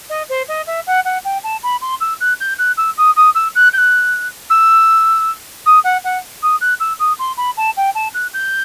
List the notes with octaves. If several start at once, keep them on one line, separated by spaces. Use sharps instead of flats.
D#5
C5
D#5
E5
F#5
F#5
G5
A5
B5
C6
E6
F#6
G6
F#6
E6
D#6
D#6
E6
F#6
G6
F#6
E6
D#6
F#5
F#5
D#6
F#6
E6
D#6
C6
B5
A5
G5
A5
F#6
G6